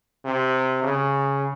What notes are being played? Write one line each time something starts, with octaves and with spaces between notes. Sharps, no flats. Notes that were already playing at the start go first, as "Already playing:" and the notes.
C3
C#3